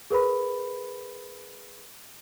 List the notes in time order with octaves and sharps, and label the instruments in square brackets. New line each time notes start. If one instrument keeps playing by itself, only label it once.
[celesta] G#4 A#4 B4 B5